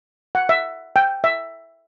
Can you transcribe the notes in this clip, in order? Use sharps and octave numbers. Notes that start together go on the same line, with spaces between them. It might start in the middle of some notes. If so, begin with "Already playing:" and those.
F#5
E5
G5
E5